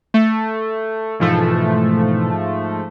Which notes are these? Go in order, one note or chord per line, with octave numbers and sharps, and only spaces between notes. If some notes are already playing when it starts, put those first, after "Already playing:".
A3
G#2 B2 E3 F3 A3 A4